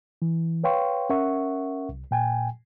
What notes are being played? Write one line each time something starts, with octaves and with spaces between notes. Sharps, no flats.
E3
B4 C#5 F5 G5 C6 C#6
C#4 A#4 E5 F#5 C#6
C2
A#2 G5 G#5